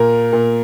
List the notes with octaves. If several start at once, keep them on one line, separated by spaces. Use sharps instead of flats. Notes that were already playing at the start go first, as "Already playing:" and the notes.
Already playing: A#2 A#4
A#2